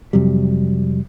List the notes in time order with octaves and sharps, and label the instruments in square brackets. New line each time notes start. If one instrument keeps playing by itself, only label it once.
[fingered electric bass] F2 C3 F#3 G3